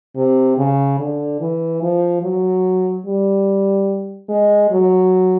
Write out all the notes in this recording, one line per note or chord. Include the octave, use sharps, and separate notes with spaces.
C3
C#3
D3
E3
F3
F#3
G3
G#3
F#3